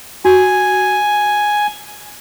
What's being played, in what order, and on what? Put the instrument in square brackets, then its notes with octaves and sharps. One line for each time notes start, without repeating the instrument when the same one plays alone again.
[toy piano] F#4 [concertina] G#5